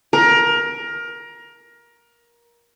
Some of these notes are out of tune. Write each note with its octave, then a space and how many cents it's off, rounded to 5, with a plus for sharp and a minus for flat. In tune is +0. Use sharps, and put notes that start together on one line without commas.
A#4 +20